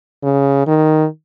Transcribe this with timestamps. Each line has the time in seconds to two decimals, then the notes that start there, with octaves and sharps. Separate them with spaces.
0.23 C#3
0.67 D#3